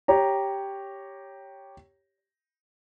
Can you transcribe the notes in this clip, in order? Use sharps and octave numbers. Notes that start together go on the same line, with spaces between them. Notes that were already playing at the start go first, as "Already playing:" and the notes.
G4 C#5 A#5